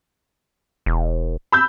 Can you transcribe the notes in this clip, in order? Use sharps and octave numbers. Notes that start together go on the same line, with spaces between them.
E1
B5 E6 G6